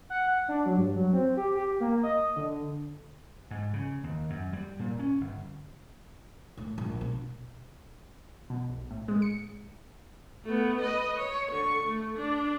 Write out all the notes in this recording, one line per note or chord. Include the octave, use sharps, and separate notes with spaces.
F#5
D4
F#3
G2
F#3
C4
G4
G4
A#3
D#5
D3
G#2
C#3
D#2
F#2
G3
A#2
C#4
G1
A2
A#1
B2
B2
B1
A2
G#3
C#7
A3 B3
B4 D#5
C#5
D3 C#6
A3
D4